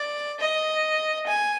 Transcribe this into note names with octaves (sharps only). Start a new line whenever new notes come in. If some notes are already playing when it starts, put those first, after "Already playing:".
Already playing: D5
D#5
G#5